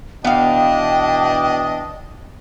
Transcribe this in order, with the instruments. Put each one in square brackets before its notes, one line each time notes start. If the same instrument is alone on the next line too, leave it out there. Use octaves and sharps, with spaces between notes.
[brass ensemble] B2 E3 D4 [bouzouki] B3 F5 [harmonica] D#5 [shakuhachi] G5